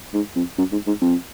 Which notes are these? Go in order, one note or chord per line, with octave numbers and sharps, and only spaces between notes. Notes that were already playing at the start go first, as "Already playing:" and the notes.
G#2
F2
F#2
G#2
G#2
F2